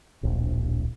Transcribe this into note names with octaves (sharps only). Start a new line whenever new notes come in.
D1 A#1